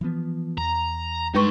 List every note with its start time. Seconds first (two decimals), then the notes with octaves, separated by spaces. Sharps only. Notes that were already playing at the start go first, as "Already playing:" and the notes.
0.01 E3 F3 B3
0.58 E2 A#5
1.35 G2 G#3 D#4 B4 C6 C#6